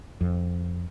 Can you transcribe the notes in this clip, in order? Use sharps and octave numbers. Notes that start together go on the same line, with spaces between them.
F2